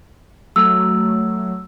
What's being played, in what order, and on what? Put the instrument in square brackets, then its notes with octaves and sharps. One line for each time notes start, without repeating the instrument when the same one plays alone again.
[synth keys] F#3 A3 [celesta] E6